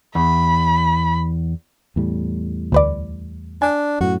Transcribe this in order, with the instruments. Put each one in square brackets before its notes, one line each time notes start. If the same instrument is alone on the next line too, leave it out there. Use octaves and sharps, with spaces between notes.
[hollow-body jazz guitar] E2 [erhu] B5
[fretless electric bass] E2 A2 G3
[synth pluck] D2 B4 D5
[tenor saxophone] D4 [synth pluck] G#5
[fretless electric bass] F#2 A2 [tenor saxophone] F#4